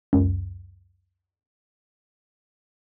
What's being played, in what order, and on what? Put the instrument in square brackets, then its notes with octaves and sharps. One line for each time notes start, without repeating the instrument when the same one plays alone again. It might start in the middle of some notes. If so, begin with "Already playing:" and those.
[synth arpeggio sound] C#2 F#2